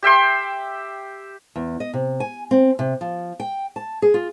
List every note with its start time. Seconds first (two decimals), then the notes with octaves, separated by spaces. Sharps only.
0.03 G4 E5 G5 C6
1.56 E2
1.80 D#5
1.94 C3
2.20 G#5
2.51 C4
2.79 C3
3.01 F3
3.40 G5
3.76 A5
4.02 G#4
4.14 F4